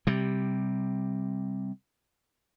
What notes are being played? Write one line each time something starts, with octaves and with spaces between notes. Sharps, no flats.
C3 G3